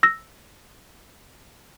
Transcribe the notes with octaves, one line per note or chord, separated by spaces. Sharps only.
E6 A#6